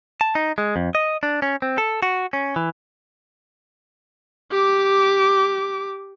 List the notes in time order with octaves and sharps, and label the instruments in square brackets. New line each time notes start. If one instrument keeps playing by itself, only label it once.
[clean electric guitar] A5
D#4
G#3
F2
D#5
D4
C#4
C4
A4
F#4
C#4
E3
[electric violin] G4 D6